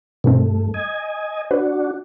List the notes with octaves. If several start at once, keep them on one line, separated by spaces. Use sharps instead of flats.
G2 B2 D#3 A3 C4
D#5 G#5
D4 F#4 B4